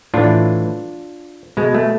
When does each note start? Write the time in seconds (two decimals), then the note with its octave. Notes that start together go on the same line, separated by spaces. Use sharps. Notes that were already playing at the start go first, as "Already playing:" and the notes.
0.14 A2 E3 D4 F4
1.57 B2 G#3
1.75 A3